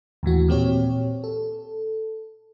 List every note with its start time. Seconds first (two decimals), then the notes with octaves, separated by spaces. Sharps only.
0.23 D#2 A2 E3 F#4
0.49 A#2 C4 G4 C#5
1.24 A4